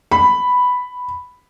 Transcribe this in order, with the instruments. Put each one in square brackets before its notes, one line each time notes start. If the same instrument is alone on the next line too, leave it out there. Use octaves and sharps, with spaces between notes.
[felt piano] B5